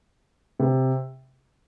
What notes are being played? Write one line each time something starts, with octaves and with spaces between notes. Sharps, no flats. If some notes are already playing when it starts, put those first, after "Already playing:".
C3